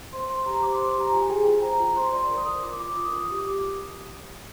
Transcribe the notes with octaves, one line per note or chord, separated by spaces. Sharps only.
C5 C6
C5 C6
G4 A#5
C5 D6
C6
C5
C6
G4 A#5
F4 G#5
G#5
G#4 G5
F4 G5
C5 A#5
F4 A#5
C5 C6
D5 C6
A#4
D#6
A#4
F4 D6
F4 D6
F4 D#6
A#4 D#6
G4 D#6
D6
G4